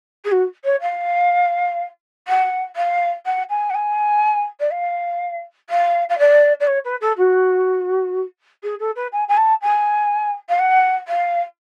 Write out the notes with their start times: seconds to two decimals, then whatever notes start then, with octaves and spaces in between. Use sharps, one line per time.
0.24 G#4
0.31 F#4
0.64 C#5
0.81 F5
2.28 F#5
2.76 F5
3.26 F#5
3.50 G#5
3.70 F#5
3.74 G#5
4.60 D5
4.72 F5
5.70 F5
6.09 F5
6.19 D5
6.60 D5
6.67 C#5
6.85 B4
7.01 A4
7.17 F#4
8.63 G#4
8.79 A4
8.96 B4
9.12 G#5
9.28 G#5
9.37 A5
9.62 G#5
10.49 F5
10.59 F#5
11.08 F5